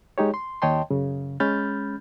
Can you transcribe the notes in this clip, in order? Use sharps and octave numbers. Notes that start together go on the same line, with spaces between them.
G#3 D#4 G4 C#5
C6
D#2 C#5 D#5 G5 A5 C6
F#2 C#3
G#3 C#4 B5 F6 G6 A6